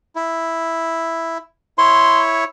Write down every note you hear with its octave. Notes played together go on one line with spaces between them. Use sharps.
E4
E4 C#5 C6